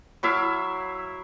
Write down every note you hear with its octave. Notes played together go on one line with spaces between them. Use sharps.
F#3 E4 E5 F5